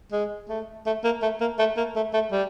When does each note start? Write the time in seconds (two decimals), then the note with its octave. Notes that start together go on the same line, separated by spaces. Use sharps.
0.12 G#3
0.49 A3
0.86 A3
1.04 A#3
1.22 A3
1.40 A#3
1.59 A3
1.77 A#3
1.96 A3
2.14 A3
2.32 G3